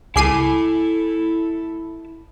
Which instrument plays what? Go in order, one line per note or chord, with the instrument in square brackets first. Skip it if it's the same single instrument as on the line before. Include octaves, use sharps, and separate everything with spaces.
[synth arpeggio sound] C#2 C7 D#7 [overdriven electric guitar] E4 A5 [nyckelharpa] A4 [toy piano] G#5 D6